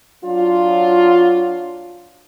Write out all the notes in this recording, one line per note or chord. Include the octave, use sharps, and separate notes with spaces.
F#3 D4 F4